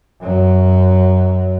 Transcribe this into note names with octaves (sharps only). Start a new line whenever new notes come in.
F#2 F#3